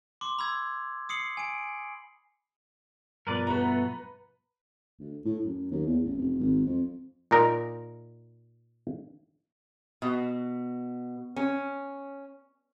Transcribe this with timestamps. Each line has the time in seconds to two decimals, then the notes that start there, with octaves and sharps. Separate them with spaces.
0.21 C6 D6
0.39 B5 E6 G#6
1.09 D#6 C7 C#7 F#7
1.37 G#5 D7
3.27 G2 B2 F3 A#4 B4 D5
3.47 A3 B3 F#4 B4 A#5
5.00 D2
5.25 A2
5.45 F#2
5.71 D#2
5.86 E2
6.04 A1
6.17 F1
6.39 G#1
6.66 F2
7.31 A#2 D#4 A#4 A#5
10.02 B2
11.36 C#4